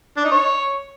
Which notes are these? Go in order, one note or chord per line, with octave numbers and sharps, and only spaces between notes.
D4
D#4
C#5